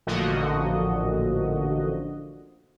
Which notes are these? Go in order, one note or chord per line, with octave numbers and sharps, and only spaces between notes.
A1 A#2 D3 F3 F#4 D#5